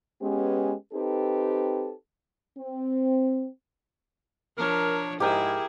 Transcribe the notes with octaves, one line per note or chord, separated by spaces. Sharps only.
G#3 B3 C#4 G4 B4
C4 D#4 G4 A4 B4
C4
F3 D4 A#4 C#5
G#2 E4 G4 G#4 A#4